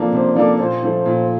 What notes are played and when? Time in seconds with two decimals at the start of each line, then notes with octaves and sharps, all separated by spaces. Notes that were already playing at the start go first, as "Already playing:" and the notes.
Already playing: C3 F3 A#3 D4 A4
0.12 C3 C5
0.35 F3 A#3 D4 A4 D5
0.59 A#2 C5
0.83 F3 A3
1.06 A#2